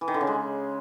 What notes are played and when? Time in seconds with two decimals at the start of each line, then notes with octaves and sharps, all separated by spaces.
0.01 E3
0.08 D#3
0.14 D3
0.21 C#3
0.27 G#3